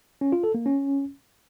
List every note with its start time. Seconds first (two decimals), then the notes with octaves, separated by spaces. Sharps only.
0.21 C#4
0.32 F4
0.43 A4
0.55 A#3
0.66 C#4